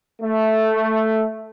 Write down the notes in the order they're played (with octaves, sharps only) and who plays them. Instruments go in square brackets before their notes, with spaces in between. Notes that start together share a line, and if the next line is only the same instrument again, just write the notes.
[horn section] A3